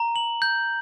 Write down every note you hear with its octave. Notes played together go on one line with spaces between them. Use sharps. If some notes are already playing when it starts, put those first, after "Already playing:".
Already playing: A#5
F#7
G6